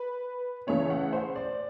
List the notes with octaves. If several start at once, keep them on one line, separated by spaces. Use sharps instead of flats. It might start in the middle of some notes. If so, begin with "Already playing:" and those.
Already playing: B4
C#3 E3 A3 C#4 C#5
F#5
C5
D5